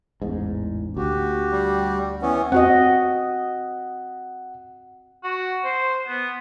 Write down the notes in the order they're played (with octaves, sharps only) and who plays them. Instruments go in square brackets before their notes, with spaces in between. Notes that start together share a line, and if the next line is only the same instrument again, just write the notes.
[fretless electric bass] A1 E2 G#2
[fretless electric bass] D2 [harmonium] F#4 G4
[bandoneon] G3
E3 B3 C#4
[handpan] C4 F#4 D#5 [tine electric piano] F#5
[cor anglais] F#4
C5
B3